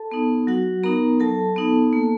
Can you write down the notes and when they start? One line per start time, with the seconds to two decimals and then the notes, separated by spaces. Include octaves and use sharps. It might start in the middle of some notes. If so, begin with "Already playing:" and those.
Already playing: A4 A5
0.11 B3 D#4
0.47 F#3 F#4 F#5
0.84 B3 D#4 A#4 A#5
1.20 F#3 A4 A5
1.56 B3 D#4
1.93 A#3